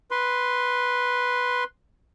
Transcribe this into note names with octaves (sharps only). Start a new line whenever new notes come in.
B4 C6